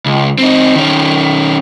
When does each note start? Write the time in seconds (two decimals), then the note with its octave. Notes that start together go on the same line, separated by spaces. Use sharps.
0.06 C#2
0.38 C4 D#4
0.76 D#3 C#4